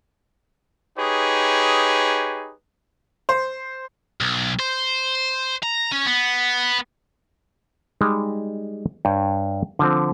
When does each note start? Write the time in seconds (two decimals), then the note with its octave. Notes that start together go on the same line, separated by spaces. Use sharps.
0.98 D#4 G4 G#4 B4 C#5
3.29 C5
4.21 B1
4.59 C5
5.63 A#5
5.92 C#4
6.06 B3
8.01 G3 G#3 D#4
9.05 G2 C#5 G5
9.79 D3 F3 C4